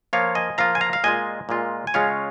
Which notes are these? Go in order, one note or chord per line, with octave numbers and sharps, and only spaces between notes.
F3 A#3 F4 C#5 F5
D#5 G#5
F3 A#3 F4 F5 A#5
G#5
F5 A#5
F5
A#2 G#3 F4 D#5 G#5
A#2 G#3 F4
G#5
C#3 G#3 C#4 F4 C#5 F5